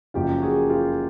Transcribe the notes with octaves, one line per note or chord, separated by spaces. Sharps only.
F#1 F#2 C#3 F3 F4 G4
F#4 G#4
F4 G4